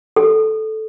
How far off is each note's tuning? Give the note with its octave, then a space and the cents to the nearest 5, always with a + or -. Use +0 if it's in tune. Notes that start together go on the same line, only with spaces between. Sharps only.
A4 -10